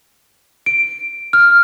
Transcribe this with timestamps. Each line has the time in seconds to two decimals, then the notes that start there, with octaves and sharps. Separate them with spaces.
0.66 D7
1.33 F6